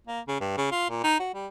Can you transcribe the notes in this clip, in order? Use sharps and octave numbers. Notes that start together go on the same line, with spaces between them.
A#3
C#3
G2
C#3
F4
A#2
D#4
F#4
G3